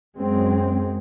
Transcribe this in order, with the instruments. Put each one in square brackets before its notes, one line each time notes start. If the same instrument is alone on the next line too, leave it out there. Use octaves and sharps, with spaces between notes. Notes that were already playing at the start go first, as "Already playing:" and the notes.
[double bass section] F#2 G#3 C4